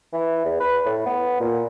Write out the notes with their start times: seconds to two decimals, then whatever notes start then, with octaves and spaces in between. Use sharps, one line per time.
0.13 E3
0.45 E2
0.60 B4
0.85 A2
1.06 B3
1.40 A#2